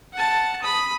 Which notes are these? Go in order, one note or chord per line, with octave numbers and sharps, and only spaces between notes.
F#5 A5
B5 D#6